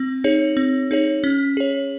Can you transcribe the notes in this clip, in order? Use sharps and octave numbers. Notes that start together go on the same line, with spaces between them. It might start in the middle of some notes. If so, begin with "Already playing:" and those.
Already playing: C4
D#4 G#4 C#5
C4
D#4 G#4 C#5
C#4
G#4 C#5